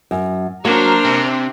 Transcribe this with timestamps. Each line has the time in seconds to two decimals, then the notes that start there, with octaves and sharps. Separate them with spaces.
0.11 F#2
0.65 F#3 A#3 D4 C5 A#5 F6
1.05 C3